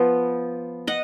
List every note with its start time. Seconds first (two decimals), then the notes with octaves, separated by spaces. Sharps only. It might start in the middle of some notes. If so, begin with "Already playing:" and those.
Already playing: F3 B3
0.87 D#5 F#5